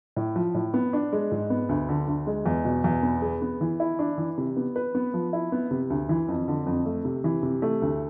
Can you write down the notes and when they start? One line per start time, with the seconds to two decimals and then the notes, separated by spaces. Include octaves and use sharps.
0.16 A2
0.36 F3
0.54 A2
0.74 B3
0.93 D4
1.13 G#3
1.32 G#2
1.50 B3
1.69 D2
1.89 D3
2.08 D2
2.27 G#3
2.46 E2
2.65 B2
2.84 E2
3.03 B3
3.22 G#4
3.42 B3
3.61 E3
3.80 E4
3.99 D4
4.18 E3
4.38 C3
4.56 B3
4.76 B4
4.95 B3
5.14 F3
5.33 E4
5.52 B3
5.71 C3
5.90 D2
6.09 E3
6.28 F2
6.48 D3
6.66 F2
6.85 A3
7.05 C3
7.24 E3
7.43 C3
7.62 A3
7.82 D2